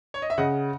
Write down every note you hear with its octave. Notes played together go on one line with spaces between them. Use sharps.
C#5
D#5
E5
C#3 D#5 F#5